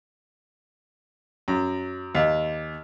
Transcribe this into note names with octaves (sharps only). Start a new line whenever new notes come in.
F#2
D#2